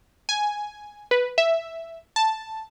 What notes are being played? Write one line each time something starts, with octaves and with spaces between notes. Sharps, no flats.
G#5
B4
E5
A5